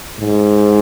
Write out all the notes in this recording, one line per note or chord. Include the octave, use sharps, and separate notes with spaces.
G#2